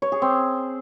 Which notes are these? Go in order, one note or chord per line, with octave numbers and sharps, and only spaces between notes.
C#5
G#4
C4